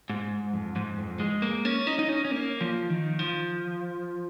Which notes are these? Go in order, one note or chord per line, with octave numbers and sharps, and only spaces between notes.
G#2
F2
G#2
F2
G#3
A#3
C#4
D#4
D#4
C#4
C#4
A#3
F3
D#3
F3